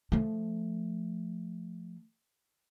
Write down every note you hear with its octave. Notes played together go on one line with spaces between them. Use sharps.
F3 A3